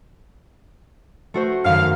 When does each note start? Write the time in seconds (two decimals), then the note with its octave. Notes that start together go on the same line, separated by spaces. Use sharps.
1.34 A3 F#4 C5
1.65 F#2 D#3 F5